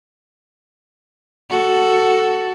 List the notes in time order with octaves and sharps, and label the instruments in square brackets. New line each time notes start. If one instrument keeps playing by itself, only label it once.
[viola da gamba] F#4 A4